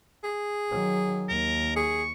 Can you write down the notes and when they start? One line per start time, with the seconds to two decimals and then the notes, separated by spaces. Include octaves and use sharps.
0.24 G#4
0.71 D#3 F#3
1.29 D#2 A#4
1.76 G#4 C#6